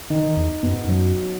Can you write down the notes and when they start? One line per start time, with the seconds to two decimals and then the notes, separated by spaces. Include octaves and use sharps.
0.10 D#3 D#4
0.23 D#3
0.37 E2
0.63 F#2 B3
0.74 G#2
0.84 F#2 F#3